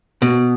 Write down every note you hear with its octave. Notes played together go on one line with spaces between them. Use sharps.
B2